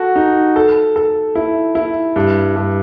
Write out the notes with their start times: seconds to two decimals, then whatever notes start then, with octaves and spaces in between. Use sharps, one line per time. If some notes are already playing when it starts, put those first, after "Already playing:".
Already playing: F#4 A4
0.16 D#4
0.56 A4
0.96 A4
1.35 E4
1.75 E4
2.16 G2
2.56 G2